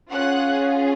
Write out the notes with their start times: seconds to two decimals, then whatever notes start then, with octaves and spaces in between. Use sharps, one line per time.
0.11 C#4 F4 G#4 F#5 F#6